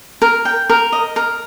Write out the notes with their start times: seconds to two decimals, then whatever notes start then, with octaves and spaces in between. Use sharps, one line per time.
0.22 A#4
0.45 G5
0.70 A#4
0.92 D#5
1.16 A#4